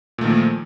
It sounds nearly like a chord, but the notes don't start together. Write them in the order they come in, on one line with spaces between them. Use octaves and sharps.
A#2 A3 D#3 A#3 F3